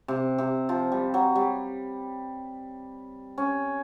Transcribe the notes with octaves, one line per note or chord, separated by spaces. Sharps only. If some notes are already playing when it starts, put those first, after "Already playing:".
C3
C3
F3
G3
F#3
G3
C#4